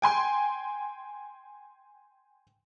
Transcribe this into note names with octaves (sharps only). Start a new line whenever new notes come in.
G5 G#5 C6